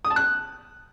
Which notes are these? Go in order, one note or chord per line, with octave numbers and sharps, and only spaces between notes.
D#6
A5
F#6